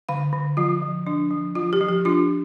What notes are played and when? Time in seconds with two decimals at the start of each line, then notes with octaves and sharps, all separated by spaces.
0.09 D3 F5
0.33 D3
0.57 F3 F4
0.82 F3
1.07 F3 D4
1.31 F3
1.55 F3 F4
1.73 G4
1.81 F3
1.89 G4
2.05 D4 F4